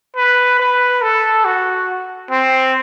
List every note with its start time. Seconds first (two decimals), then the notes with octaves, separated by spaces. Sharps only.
0.16 B4
0.60 B4
1.02 A4
1.45 F#4
2.31 C4